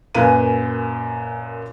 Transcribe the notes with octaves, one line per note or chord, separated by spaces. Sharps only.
F#2 A#2 B4 F5 G#5 D#7